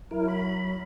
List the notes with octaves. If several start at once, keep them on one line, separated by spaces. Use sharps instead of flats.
F#3 E4 A#4
B5